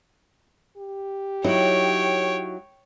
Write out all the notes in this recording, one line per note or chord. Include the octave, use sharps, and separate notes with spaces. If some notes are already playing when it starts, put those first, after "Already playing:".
G4
F#3 D#4 E4 C#5 G5